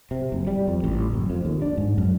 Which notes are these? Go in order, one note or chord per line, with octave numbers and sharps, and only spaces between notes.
C3
F#1
G3
F2
A1
F#1
F2
D#2
D4
G#2
F#2